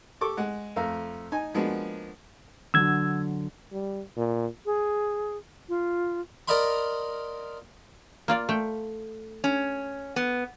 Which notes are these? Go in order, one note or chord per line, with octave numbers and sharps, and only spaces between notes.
G4 A4 C#6 D6
G#3 F#5
F2 A3 F5 A#5
D#4 G#5
F3 G#3 A#3 B3 D4 F#4
D3 F#3 E6 G#6
G3
A#2
G#4
F4
A#4 D5 D#5 F5 B5 C6
A#3 F4 D5
A3 G5
C#4
B3